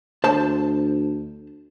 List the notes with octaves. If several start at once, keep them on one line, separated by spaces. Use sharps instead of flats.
D2 C5 A5